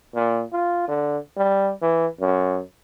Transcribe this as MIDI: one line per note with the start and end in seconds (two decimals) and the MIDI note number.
0.15 0.43 46
0.53 0.85 65
0.88 1.18 50
1.37 1.72 55
1.82 2.06 52
2.21 2.60 42